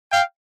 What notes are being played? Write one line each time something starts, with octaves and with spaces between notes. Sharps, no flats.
F5 G5